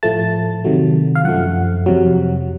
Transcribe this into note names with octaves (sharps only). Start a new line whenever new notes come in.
A2 F3 A3 A5
C3 D#3 F#3 A3
F5
F#2 F3 A3 F#5
F2 C3 F#3